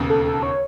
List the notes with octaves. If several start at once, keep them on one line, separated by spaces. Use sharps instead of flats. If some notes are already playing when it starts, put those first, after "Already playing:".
Already playing: E1 D#2 C#3
A4
A4
C#5